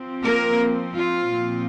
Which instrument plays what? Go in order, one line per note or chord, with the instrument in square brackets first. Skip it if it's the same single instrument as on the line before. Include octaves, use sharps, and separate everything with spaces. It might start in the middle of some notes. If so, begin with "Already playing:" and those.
Already playing: [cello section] F3 C4
A#3 A#4
F4
A#2 F3 C4